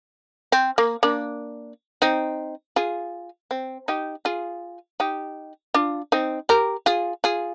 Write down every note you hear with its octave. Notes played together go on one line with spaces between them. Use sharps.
C4
A#3
A#3 D4
C4 D#4
F4 G#4
C4
D#4 G4
F4 G#4
D#4 G4
D4 F4
C4 D#4
G4 A#4
F4 G#4
F4 G#4